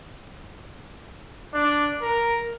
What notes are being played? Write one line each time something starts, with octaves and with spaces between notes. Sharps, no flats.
D4
A#4